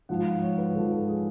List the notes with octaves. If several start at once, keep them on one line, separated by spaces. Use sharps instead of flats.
G#2 F3 F#5
F5
C#5
B4
G#2 F3 A4
A4
G#4